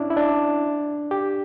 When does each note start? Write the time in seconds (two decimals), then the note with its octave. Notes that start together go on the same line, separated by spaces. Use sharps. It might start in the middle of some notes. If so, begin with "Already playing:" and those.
Already playing: C#4 D4 E4
0.10 E4
0.17 D4
1.11 G4